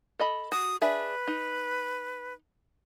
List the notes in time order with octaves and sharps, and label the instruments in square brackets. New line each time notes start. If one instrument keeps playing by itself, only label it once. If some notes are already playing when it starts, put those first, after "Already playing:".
[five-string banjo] A4 D#5 B5
[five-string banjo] F#4 [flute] D#6
[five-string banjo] D4 G#4 E5 [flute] B4
[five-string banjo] D#4